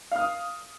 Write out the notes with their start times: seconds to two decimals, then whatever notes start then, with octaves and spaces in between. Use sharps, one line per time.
0.11 F5
0.16 F6
0.20 D#6